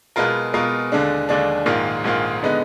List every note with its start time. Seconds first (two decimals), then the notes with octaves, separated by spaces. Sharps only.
0.16 B2 G#3 B3 F4 A#4
0.53 B2 G#3 B3 F4 A#4
0.92 D#2 D3 G#3 D4
1.29 D#2 D3 G#3 D4
1.66 A#1 G#2 D#3 A#3 F4
2.04 A#1 G#2 D#3 A#3 F4
2.43 D3 G#3 B3 D#4